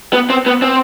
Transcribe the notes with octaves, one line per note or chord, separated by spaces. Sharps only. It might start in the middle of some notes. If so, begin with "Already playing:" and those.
B3
C4
B3
C4